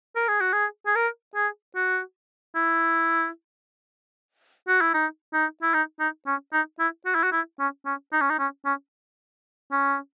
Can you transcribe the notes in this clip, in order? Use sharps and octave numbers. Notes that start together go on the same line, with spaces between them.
A#4
G#4
F#4
G#4
G#4
A#4
G#4
F#4
E4
F#4
E4
D#4
D#4
E4
D#4
D#4
C#4
D#4
E4
F#4
E4
F#4
E4
C#4
C#4
D#4
C#4
D#4
C#4
C#4
C#4